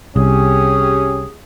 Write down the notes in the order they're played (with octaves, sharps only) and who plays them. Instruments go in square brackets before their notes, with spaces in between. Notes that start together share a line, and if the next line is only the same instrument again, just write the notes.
[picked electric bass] C2 [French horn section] C#4 G4 [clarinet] G#4